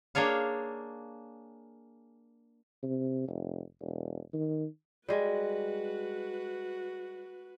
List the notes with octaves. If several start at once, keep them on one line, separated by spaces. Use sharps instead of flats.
A#3 D4 G#4 C#5 F5
C3
F1
E1
D#3
G3 G#3 F#4 B4